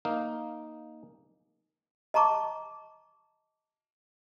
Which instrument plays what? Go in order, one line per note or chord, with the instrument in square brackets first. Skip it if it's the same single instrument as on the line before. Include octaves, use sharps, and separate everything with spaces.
[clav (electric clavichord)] A#3 D#4 F5
[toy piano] D#5 A5 A#5 C#6 D6